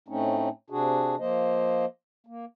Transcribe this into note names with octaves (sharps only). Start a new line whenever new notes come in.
A2 A3 C4 C#4 D#4
C3 D4 F#4 G#4
F3 A#3 C5 D#5
A#3